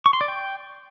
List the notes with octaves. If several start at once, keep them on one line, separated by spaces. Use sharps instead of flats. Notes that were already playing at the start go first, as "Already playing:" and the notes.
C#6
C6
D5
G5